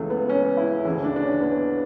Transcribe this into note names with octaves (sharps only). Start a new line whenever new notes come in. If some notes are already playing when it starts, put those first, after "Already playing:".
Already playing: C#2 C#3 E3 A3
B3
C#4
E4
D2 C#3 E3 E4
D4
D4
C#4
B3